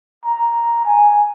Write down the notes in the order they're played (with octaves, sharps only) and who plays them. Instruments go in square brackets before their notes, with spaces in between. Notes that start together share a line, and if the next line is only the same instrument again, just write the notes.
[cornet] A#5
G#5